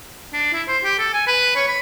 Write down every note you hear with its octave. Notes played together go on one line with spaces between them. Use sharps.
D4
E4
C5
G4
A4
G#5
B4
C#5
B5